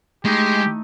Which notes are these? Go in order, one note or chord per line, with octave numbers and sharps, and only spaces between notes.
G#3 A3 D#4 E4 G4